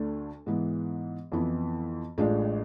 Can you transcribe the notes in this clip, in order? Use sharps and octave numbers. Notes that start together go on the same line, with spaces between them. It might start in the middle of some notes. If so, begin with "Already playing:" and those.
Already playing: D2 D3 A3
G#2 E3 B3
F2 E3 B3 E4
A1 A2 G#3 D4 F4